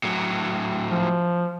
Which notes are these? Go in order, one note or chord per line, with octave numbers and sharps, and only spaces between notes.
A2 F#3
F3